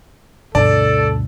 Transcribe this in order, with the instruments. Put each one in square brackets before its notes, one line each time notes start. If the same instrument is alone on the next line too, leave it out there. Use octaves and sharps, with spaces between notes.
[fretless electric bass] D2 B2 D4 [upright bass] G2 [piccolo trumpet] A4 [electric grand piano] D5 A5